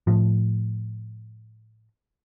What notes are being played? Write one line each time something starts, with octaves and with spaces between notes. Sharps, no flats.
A2 F3